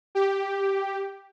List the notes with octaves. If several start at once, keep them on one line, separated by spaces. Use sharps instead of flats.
G4